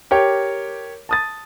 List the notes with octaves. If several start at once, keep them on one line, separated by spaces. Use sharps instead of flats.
G4 A#4 C#5 G5
A5 D#6 A6